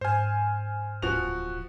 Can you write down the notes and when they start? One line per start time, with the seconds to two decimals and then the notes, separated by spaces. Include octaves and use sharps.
0.01 G#2 C5 G#5 F6
1.02 D1 E2 F3 F#4 F7